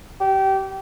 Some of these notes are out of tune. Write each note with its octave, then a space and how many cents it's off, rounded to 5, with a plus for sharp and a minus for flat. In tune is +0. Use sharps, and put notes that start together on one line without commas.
G4 -25